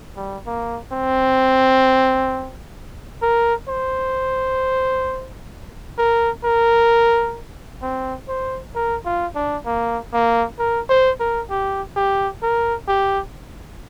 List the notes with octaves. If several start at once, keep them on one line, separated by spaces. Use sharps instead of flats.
G3
A#3
C4
A#4
C5
A#4
A#4
C4
C5
A#4
F4
D4
A#3
A#3
A#4
C5
A#4
G4
G4
A#4
G4